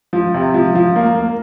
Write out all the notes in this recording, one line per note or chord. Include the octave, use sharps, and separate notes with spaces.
F3
C3
F3
F3
A#3
A#3